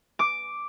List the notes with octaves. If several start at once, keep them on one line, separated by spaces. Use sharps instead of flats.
D6